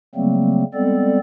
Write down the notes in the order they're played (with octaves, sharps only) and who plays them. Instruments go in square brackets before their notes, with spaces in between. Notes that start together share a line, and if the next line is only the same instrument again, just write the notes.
[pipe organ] C#3 F#3 G3 A3 A#3 C4
G3 G#3 B3 C4 A4 D5